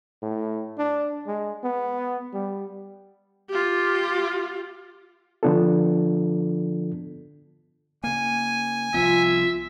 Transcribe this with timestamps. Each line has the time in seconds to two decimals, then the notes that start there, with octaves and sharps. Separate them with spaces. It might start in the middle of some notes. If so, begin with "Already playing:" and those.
0.22 A2
0.78 D4
1.27 G#3
1.64 B3
2.33 G3
3.49 F4 G4
5.43 D3 F3 B3 D4 F4 A4
8.04 C#3 A#3 G#5
8.94 C2 F3 B3 F4 E5